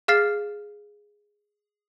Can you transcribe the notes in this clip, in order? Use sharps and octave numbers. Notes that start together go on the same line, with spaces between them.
G#4 F5 F6 A6 C7